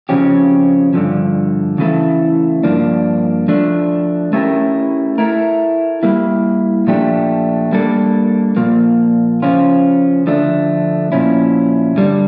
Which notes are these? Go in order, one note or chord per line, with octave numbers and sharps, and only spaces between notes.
F2 C#3 F3 C#4 G4
G2 D3 F3
C#3 E3 A3 E4 A4
G2 F3 A#3 D4
F3 A3 D4
A3 C#4 E4 G4 A#4
A3 E4 A#4
G3 A#3 E4
A#2 F3 A3 D4 G4
G3 A#3 D4 A4
A#2 F3 A#3
C#3 F3 C#4 F4
D3 F3 A3 D4
A#2 F3 C#4 E4
G2 D3 G3 D4